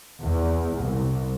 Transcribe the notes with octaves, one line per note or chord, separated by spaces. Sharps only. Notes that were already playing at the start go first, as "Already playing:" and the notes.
E2
C2